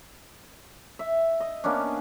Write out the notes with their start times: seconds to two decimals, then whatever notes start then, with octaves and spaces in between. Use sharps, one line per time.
0.99 E5
1.40 D#5
1.64 A#3 B3 C#4 D4